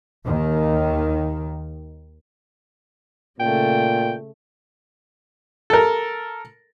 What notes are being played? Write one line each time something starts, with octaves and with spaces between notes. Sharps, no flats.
D#2 D#3
A#2 C#3 A3 G5
A4 A#4